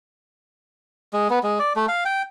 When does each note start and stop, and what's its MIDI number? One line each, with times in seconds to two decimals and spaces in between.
1.13 1.28 56
1.30 1.39 59
1.43 1.59 56
1.59 1.73 74
1.76 1.86 57
1.88 2.04 77
2.05 2.22 79